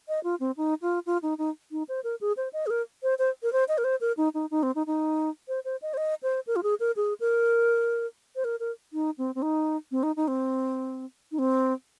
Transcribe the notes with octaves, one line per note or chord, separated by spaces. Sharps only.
D#5
F4
C4
D#4
F4
F4
D#4
D#4
D#4
C5
A#4
G#4
C5
D#5
G#4
A#4
C5
C5
A#4
C5
D#5
A#4
C5
A#4
D#4
D#4
D#4
C4
D#4
D#4
C5
C5
D#5
C5
D#5
C5
A#4
F4
G#4
A#4
G#4
A#4
C5
A#4
A#4
D#4
C4
C4
D#4
C4
D#4
D#4
C4
D#4
C4